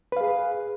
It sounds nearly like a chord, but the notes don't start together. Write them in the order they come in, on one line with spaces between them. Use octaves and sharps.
B4 F5 G#4